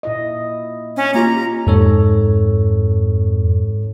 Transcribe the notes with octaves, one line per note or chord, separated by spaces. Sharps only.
A#2 E4 D#5
C#4
A#3 F4 G4 A#5
F2 G#2 A4 C#5